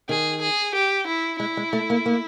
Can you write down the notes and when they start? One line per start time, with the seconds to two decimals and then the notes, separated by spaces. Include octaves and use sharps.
0.09 D#3 G#4
0.42 G#4
0.75 G4
1.07 E4
1.40 G#3 E4
1.57 G#3
1.73 A3
1.90 A#3
2.06 A#3